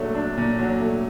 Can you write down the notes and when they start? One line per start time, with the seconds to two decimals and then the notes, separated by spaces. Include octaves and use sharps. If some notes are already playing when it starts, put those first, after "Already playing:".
Already playing: A#2 F#3 A3 D4
0.15 D4
0.37 A#2
0.59 F#3
0.81 A3